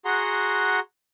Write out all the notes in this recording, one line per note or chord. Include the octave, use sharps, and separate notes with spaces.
F#4 G#4 F#5 A#5 C6